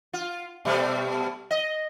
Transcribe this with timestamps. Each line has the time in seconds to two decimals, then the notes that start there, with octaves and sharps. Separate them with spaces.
0.13 F4
0.65 B2 G3 A3
1.51 D#5